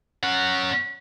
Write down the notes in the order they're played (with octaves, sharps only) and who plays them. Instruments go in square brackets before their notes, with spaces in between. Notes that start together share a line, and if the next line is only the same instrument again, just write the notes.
[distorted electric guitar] C#4 F#5